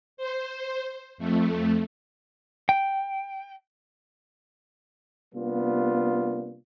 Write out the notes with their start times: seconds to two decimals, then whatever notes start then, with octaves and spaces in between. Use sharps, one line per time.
0.17 C5
1.18 F2 A3
2.69 G5
5.35 C3 G3 A#3 B3 D4 F4